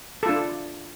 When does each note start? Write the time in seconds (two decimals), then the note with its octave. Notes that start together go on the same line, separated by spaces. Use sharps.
0.23 A4
0.26 F4
0.29 D4